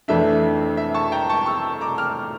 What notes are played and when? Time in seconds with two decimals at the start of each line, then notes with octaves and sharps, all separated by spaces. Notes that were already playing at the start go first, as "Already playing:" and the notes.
0.08 F2 E3 A3 D4 E5
0.77 E5
0.94 A5 C#6
1.12 G5 A#5
1.29 A5 C#6
1.46 C#6 E6
1.81 A#5 D6
1.98 D6 F6